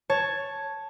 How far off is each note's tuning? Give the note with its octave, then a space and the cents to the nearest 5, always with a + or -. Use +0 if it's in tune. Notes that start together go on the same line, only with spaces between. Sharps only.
C#5 +0 A5 +0